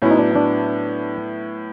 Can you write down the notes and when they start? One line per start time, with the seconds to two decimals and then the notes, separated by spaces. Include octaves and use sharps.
0.02 A2 F#3 B3 C#4 E4
0.11 D#4
0.19 D4
0.36 D4